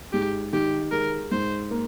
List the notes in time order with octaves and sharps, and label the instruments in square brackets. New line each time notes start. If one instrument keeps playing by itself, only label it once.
[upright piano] G#2 [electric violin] G4
[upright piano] D#3 [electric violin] G4
[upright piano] G#3 [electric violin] A#4
[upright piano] G#2 [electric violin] C5
[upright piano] A#3